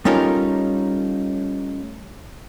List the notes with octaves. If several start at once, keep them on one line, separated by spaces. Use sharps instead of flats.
G3 A3 C#4 D#4 F4 A#4